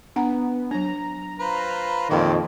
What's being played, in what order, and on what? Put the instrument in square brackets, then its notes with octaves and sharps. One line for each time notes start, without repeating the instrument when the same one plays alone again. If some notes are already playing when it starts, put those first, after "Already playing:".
[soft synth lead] B3 [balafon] D4 F#5 A#5
[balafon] F#3 D4 [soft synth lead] A#5
[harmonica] F4 B4 C5
[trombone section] F2 A#2 D#3 [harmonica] E4 G4 D5 [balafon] F5